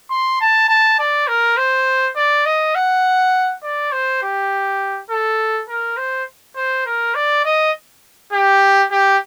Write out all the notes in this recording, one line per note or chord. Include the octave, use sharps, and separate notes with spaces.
C6
A5
A5
D5
A#4
C5
D5
D#5
F#5
D5
C5
G4
A4
A#4
C5
C5
A#4
D5
D#5
G4
G4